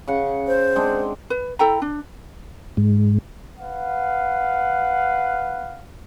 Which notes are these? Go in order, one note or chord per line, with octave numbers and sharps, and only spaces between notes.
C#3 F#5
C5
G#3 C4 D4
B4
E4 A4 G5 A#5
D4
G#2
B4 F5 F#5